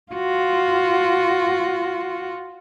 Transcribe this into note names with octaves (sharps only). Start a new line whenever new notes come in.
F4 F#4